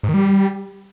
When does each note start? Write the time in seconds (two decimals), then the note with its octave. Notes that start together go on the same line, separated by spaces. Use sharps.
0.03 G#2
0.09 D#3
0.14 G3